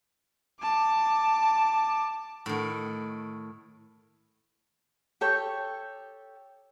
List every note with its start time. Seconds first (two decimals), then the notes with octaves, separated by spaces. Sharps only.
0.61 A5 D6
2.46 A2 D#3
5.21 G4 A4 C#5 G5